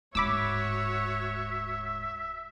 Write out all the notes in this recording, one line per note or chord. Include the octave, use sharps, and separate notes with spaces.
D1 G#2 F#4 C#5 E5 B5 D6 E6